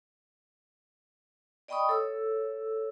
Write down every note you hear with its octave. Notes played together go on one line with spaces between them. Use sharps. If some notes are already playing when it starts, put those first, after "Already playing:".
D5 D#5 G5 B5 C#6 D#6
A4 C#5 E6